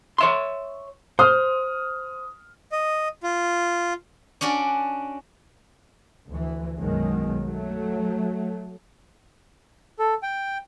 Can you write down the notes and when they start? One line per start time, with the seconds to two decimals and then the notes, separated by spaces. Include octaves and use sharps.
0.18 C#5 E5 C6
1.19 C5 D#6 F6
2.72 D#5
3.23 F4
4.41 C#4 D4 F#4 D5
6.29 D2 E3
6.78 B1 F#2 B2 D#3 F#3 G#3
7.43 F#3 A3
9.99 A4
10.23 G5